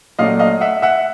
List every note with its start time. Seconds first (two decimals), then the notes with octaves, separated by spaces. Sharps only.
0.19 A#2 F#3 A3 D4 D#5 F5
0.40 D#5 F5
0.61 E5 F#5
0.82 E5 F#5